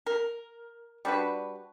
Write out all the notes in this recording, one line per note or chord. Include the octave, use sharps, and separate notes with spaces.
A#4
G3 D4 F#4 B4